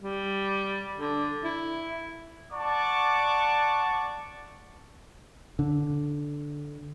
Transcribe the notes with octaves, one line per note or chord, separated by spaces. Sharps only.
G3
D3
E4
D5 F#5 A5 C#6 D6
D3